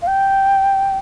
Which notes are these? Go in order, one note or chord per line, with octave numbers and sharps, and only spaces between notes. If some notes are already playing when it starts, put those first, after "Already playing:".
F5
G5